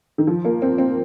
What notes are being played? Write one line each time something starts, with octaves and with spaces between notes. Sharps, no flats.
D#3
F3
A#3
C4
C4